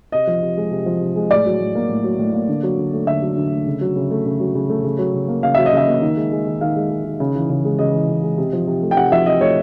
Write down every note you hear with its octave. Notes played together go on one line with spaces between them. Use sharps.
C3 D#5
F3
C3
G#3
C3
F3
C3
G#3
A2 D5
F#3
A2
A#3
A2
F#3
A2
A#3
D3
F#3
D3
A3
D3 E5
F#3
D3
A3
C#3
F#3
C#3
A3
C#3
F#3
C#3
A3
C#3
F#3
C#3
A#3
C#3 F5
F#3 E5
D#5
C#3 E5
A#3
D#3
G#3
G#3
D#3
D#3 F5
G#3
G#3
D#3
C#3
E3
C#3
G#3
C#3 D#5
E3
C#3
G#3
C3
F3
C3
A3
G5
C3 F#5
F3 E5
C3 D#5
A3 C#5